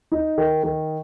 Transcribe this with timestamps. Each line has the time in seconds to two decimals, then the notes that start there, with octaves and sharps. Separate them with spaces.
0.12 D#4
0.38 D#3
0.63 D#3